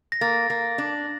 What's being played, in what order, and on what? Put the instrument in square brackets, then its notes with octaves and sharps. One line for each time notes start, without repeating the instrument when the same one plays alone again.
[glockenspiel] A#6
[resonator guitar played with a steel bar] A#3 [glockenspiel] A6
[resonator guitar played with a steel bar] A#3
D4